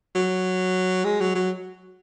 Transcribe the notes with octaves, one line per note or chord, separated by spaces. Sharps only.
F#3
G#3
F#3
F#3